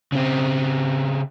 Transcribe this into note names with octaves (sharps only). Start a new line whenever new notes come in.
C#3 C4